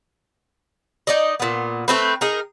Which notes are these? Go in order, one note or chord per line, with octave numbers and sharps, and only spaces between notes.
D#4 D5 D#5
A#2 B3
A3 C4 B4
D#4 G#4 A#4